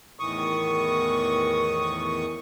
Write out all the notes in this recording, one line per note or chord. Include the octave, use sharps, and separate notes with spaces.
E2 A2 D#3 E3 C#6 D#6